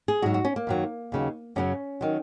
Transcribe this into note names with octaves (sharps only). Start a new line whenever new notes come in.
G#4
G#2 F#3 F#4
F#4
C#4
A#3
F#2 D#3 F#3
D#2 C#3 F#3
F#2 C#3 F#3 C#4
D#3 F#3